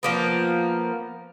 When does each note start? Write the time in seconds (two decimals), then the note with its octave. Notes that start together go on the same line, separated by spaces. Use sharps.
0.03 F3 A#3 B3